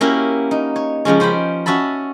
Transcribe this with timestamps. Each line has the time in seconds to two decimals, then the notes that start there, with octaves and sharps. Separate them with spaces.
0.01 A#3 C#4 E4 F#4 G4 A#4
0.51 D#4
0.76 C#5
1.05 C#3 F3 G#3 C#4
1.20 C#4 C5 G5 B5
1.66 C#4 F#4 E5 A5 B5